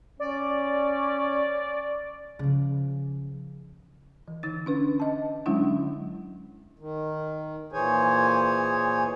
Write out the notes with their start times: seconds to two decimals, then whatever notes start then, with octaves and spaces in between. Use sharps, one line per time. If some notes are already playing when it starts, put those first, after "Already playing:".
0.20 C#4 D5
2.39 C#3 F3
4.28 E3
4.43 D3 D#4 A6
4.66 C#4 D4 B4
5.00 D#5 A5
5.46 D3 F#3 G#3 C#4 D4 E4
6.79 D#3
7.73 A#2 E3 G#4 C5 C#5 G#5